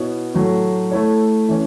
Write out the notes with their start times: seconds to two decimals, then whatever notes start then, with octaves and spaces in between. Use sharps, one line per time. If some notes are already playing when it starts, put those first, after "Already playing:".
Already playing: B2 B3 E4 C#5
0.34 A2 F#3 A3
0.91 A3 E4 C#5
1.48 E3 C#4